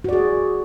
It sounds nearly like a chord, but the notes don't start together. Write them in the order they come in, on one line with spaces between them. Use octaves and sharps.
F#4 D5 G#4